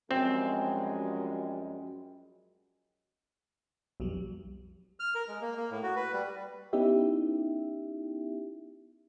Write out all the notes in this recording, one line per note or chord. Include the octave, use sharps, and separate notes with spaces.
F#2 F3 G3 G#3 C4 G5
B1 F2 F#3 G3
F6
A#4
G#3
A#3
A#3
A2
F#4
B4
G3
B3 C#4 D#4 E4 G4 E5